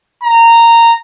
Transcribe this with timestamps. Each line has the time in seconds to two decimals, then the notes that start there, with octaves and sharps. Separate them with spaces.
0.23 A#5